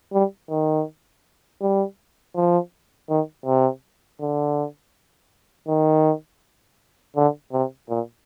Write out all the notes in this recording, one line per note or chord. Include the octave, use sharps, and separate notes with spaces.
G3
D#3
G3
F3
D#3
C3
D3
D#3
D3
C3
A#2